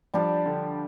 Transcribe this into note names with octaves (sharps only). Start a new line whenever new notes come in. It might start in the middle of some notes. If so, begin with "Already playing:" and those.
F3 G3 D4 G4
D3